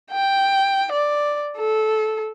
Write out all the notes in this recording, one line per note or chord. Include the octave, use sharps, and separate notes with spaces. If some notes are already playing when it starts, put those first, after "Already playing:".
G5
D5
A4